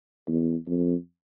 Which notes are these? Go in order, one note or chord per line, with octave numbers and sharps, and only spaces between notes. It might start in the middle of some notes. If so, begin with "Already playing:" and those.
E2
F2